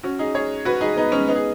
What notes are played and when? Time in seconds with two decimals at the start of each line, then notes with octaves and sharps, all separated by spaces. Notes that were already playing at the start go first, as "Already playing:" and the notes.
0.03 C#4 F#4
0.19 D#4 G#4
0.35 G#4 C#5
0.65 F#4 B4
0.81 D#4 G#4
0.96 B3 D#4
1.12 G#3 C#4
1.28 B3 D#4
1.36 G#4